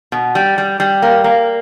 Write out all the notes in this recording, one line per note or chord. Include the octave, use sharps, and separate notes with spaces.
B2
G3
G3
G3
A#3
A#3